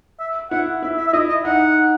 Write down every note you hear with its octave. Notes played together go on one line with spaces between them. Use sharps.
E5
E4 F#5
E4 E5
E5
E5
E4 D#5
D#5
D#4 F#5